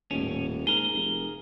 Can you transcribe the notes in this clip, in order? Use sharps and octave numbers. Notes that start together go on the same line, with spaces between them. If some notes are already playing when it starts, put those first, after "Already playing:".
D#1 A2 C#4
G#2 G#4 A#4 G7
F1